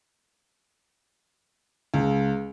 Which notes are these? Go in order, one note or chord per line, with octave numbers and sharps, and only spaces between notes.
C#2